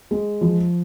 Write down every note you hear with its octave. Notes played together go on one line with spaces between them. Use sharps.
G#3
F3